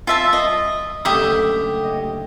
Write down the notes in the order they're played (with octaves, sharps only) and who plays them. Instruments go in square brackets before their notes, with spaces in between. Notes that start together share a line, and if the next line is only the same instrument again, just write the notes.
[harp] G3 [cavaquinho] F4 E5 A5
[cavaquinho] D#5
[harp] F#1 D2 A3 [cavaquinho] G4 E5 D#6
[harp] C#5 D#5